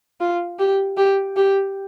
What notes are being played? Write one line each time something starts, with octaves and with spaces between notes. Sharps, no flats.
F4
G4
G4
G4